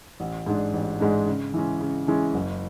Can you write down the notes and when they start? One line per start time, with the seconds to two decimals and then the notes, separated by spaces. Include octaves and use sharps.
0.20 A1
0.46 G#2 G#3 D4
0.73 A1
1.00 G#2 G#3 D4
1.27 C#3
1.54 E3 G#3 C#4
1.80 C#3
2.08 E3 G#3 C#4
2.34 F#1